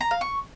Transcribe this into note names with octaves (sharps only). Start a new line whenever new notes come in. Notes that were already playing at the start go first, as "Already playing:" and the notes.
A#5
F5
C#6